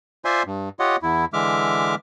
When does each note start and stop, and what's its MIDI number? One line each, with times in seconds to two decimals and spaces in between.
0.25 0.43 65
0.25 0.43 72
0.25 0.43 74
0.25 0.43 76
0.25 0.43 80
0.25 0.43 84
0.46 0.69 43
0.80 0.96 65
0.80 0.96 67
0.80 0.96 73
0.80 0.96 75
0.80 0.96 78
1.02 1.25 40
1.02 1.25 64
1.33 1.95 50
1.33 1.95 52
1.33 1.95 56
1.33 1.95 76
1.33 1.95 86
1.33 1.95 89